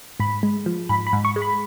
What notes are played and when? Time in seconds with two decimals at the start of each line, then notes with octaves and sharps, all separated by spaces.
0.20 G#2 B5
0.43 G#3
0.66 F3
0.89 G#2 B5
1.07 B5
1.13 G#2
1.25 C#6
1.36 G#3
1.42 B5